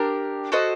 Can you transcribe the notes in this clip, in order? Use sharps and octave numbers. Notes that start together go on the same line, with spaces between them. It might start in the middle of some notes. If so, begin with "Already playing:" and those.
Already playing: D4 G4 A#4
F#4 A4 C5 D#5